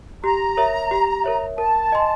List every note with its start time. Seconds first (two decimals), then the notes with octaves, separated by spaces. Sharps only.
0.23 G4 A#5
0.57 A#4 C#5 E5
0.91 G4
1.24 A#4 C#5 E5
1.58 A#4 A5
1.92 D#5 G#5 C6